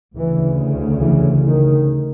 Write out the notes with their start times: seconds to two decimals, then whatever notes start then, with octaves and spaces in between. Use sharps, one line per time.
0.16 D2 C#3 E3
1.01 E3
1.44 D#3